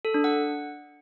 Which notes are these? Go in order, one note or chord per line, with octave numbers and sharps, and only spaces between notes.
A4
D4
F#5